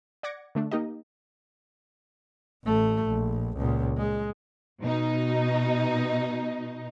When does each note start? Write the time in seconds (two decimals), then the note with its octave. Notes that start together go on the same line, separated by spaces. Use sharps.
0.23 D5 F#5 D6 G#6 A#6 C#7
0.55 D3 A3 D4
0.71 A#3 D#4 G4 A#4 D#5
2.64 A1 A3
3.07 A#1
3.57 C#2 A#2
3.98 G#3
4.80 B2 D#4